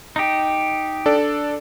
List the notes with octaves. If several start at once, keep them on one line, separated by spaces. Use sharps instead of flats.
D#4 G4
D4 A4 D5